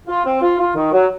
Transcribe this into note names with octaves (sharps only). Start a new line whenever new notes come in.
F4
C4
F4
F4
D#3
F#3